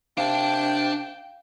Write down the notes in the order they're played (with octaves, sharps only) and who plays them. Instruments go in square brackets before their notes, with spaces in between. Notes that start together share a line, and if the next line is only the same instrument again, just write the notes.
[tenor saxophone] C3 [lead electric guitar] D4 A5 [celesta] F5 [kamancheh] G5